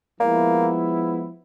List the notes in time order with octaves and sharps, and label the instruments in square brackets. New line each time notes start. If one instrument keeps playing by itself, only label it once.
[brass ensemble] F3 G#3 B3 E4 [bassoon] A#3